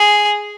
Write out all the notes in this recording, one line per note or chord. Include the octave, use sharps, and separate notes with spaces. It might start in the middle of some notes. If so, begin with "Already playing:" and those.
Already playing: G#4